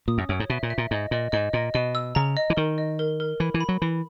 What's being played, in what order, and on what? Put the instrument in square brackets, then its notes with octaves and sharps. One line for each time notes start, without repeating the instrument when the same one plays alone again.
[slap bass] A#2 [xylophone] D#6
[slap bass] F#2
[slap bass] F#2 [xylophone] C#5
[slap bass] G#2
[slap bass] B2 [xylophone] E5
[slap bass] A#2
[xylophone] E5
[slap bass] A#2
[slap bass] G#2 [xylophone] D#5
[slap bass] A#2 [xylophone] D#5
[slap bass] G#2 [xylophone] D#5
[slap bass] A#2 [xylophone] D#5
[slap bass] B2 [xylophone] D#5
[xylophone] E6
[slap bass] C#3 [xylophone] A#5
[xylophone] D#5
[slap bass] E3
[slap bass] D#3 [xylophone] A#4
[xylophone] D#5
A#4
A#4
[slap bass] E3 [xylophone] B5
[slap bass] E3
[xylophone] B5
[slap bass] F#3
[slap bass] E3 [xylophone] B5